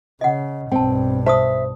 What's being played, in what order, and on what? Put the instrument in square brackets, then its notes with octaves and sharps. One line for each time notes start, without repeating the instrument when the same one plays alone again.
[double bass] C#3 [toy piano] D#5 F#5
[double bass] B1 G2 [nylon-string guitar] C4 [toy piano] G5 A5
[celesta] C5 [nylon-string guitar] E5 [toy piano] A5 C#6 D#6